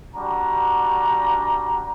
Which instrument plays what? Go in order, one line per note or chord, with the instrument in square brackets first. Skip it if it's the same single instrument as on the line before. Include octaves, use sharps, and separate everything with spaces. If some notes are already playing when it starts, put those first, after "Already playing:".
[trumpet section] G3 D4 F#4 A#5